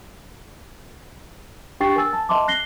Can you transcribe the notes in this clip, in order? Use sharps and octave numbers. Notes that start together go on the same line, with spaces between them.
D4 G4 G5 C#6 A6 C7
A#4 G#5 E6 A6
A5
D#5 E5 A5 C6 D6
F#6 A#6 C7 G7